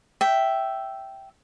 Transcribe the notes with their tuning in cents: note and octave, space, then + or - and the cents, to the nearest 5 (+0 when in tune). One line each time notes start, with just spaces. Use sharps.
E5 +0 G5 -10